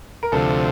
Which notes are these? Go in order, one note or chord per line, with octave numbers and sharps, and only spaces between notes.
A#4
D2 C3 F3 A4